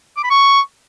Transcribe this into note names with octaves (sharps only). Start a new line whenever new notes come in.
D6
B5
C#6